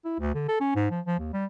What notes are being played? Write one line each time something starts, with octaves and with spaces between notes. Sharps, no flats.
E4
D2
D3
A4
C#4
G#2
F3
F3
D#2
G3